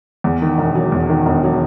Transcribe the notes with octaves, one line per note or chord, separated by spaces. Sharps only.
E2
D#3
E1
F#3
E2
D#3
E1
F#3